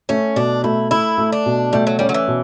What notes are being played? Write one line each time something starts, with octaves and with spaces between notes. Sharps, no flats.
A3 C#4
B2 D4
A3 E4
A3 E4
A3
D4
B2
G3 A3
F#3
G3 C#4
F#3
E3
B2